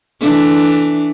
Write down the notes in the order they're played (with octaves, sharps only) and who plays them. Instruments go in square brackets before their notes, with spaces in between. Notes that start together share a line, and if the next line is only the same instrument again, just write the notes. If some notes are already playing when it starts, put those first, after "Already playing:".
[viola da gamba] E3 A3 D4